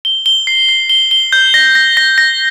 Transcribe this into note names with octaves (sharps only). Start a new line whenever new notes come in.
G7
G7
C7
C7
G7
G7
G6
A#6
A#6
A#6
A#6